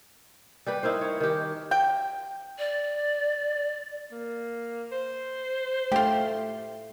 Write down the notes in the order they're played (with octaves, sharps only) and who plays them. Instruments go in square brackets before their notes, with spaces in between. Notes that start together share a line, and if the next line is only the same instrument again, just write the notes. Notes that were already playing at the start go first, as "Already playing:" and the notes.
[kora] G3 G4 B4
D#4 E4 A#4 C5
C#5
D#3 G4
[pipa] G5
[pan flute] D5
[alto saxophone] A#3
C5
[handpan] A3 [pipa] F4 G4